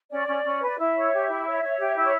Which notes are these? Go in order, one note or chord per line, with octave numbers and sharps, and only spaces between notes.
C#4 D5
C#4
C#4
B4
D5
E4 E5
C#5
G4
E4
C#5
C#5
G4
E4
C#5